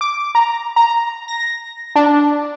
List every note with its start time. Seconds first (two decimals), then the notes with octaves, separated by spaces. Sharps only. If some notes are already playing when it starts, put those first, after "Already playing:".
0.01 D6
0.35 A#5
0.76 A#5
1.28 A#6
1.96 D4